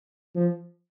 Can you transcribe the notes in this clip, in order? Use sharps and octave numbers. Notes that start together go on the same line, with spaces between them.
F3